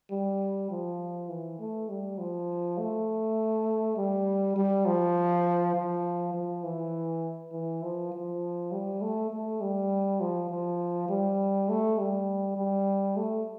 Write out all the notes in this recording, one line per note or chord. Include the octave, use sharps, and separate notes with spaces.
G3
F3
E3
A3
G3
F3
A3
G3
G3
F3
F3
F3
E3
E3
F3
F3
G3
A3
A3
G3
F3
F3
G3
A3
G3
G3
A3